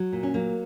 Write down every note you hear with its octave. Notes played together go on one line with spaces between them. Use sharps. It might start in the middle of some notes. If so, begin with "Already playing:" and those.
Already playing: F#3
A#2
C#4
F#3 A#3